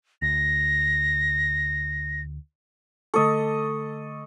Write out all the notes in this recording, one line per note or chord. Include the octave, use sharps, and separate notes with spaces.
D2 A#6
D3 A3 A4 D#5 C#6